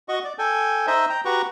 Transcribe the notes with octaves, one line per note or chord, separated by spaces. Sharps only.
F#4 D#5 C#6
D5
A4 G5 G#5
D#4 C5 D#5 E5
G5 A#5
F#4 G4 B4 A#5 C#6